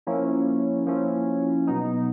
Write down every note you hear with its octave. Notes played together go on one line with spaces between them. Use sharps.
F3 A#3 C#4 E4
F3 A#3 C#4 E4
B2 F#3 B3 D#4